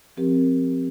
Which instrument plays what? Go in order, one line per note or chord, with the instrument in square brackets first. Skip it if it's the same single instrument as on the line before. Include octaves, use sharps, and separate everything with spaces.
[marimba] F3 C4 G4 A#4